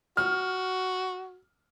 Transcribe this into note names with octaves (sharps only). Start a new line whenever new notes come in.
F#4 F6